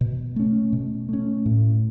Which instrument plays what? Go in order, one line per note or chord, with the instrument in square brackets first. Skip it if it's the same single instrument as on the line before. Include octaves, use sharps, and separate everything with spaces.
[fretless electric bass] B2
A3 C#4
B2
A3 C#4
A2